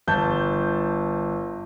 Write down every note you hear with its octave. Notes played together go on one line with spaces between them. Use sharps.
G1 A5 G6